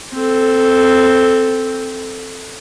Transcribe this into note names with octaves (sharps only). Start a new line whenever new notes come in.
C4 A4